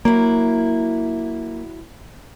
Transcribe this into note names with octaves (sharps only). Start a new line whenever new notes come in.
F#3 A#3 E4